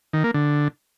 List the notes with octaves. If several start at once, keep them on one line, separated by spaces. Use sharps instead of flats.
D#3
A#3
D3